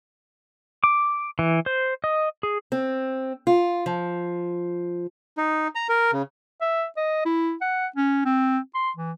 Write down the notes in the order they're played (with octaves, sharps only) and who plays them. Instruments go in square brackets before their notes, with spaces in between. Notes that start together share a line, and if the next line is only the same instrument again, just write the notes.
[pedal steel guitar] D6
E3
C5
D#5
G#4
[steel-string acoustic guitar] C4
F4
F3
[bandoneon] D#4
A#5
A#4
C#3
[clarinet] E5
D#5
E4
F#5
C#4
C4
C6
E3